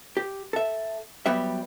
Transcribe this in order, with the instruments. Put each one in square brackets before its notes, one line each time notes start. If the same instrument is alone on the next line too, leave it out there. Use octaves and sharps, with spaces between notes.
[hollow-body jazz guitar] G4
A4 E5
F#3 G3 B3 G4 E5